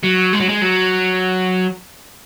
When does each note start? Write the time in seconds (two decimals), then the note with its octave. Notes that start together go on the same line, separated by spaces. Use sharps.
0.03 F#3
0.33 G#3
0.40 F#3
0.49 G#3
0.62 F#3